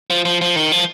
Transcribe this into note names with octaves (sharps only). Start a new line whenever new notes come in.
F3
F3
F3
D#3
F3